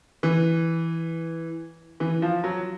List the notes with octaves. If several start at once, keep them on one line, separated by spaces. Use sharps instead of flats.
E3
E3
F3
F#3